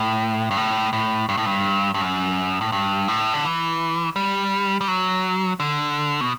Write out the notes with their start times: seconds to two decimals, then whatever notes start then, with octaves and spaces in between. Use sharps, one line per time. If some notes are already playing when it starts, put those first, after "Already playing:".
Already playing: A2
0.51 G2
0.57 A2
0.93 A2
1.29 G2
1.37 A2
1.46 G2
1.94 G2
2.01 F#2
2.61 A2
2.72 G2
3.08 A2
3.34 D3
3.44 E3
4.16 G3
4.81 G3
4.88 F#3
5.60 D3
6.21 B2